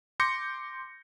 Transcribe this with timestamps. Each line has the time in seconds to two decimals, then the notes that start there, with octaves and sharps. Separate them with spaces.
0.20 C6 D6 G6 A#6 C#7